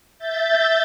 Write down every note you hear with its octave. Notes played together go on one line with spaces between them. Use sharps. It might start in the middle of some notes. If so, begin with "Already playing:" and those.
E5 G6 A6